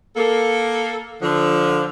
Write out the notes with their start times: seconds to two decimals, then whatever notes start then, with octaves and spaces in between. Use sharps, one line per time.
0.17 A#3 A4
1.22 D3 F3